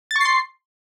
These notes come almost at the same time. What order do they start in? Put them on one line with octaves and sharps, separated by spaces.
A6 C#6 C7 C6